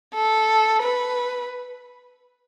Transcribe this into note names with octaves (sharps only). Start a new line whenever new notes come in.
A4
B4